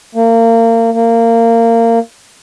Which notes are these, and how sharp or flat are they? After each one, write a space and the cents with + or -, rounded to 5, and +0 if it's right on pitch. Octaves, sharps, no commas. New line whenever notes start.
A#3 -30
A#3 -20